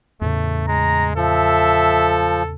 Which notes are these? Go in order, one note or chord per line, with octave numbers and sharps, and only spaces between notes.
E2 A2 C#3 A3
G#3 A#5
F3 A4 E5